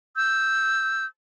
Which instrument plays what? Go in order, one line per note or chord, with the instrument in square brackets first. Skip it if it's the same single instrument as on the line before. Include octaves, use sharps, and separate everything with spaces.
[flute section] E6 G6